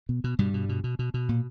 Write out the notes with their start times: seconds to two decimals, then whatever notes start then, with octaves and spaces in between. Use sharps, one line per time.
0.09 B2
0.24 B2
0.39 G2 B2 G3
0.54 B2
0.69 B2
0.84 B2
0.99 B2
1.14 B2
1.29 A#2